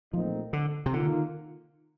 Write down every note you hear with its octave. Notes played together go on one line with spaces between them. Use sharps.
A#2 F3 A3 C4 D#4
D3
C3
D3 D#3 A#3 F4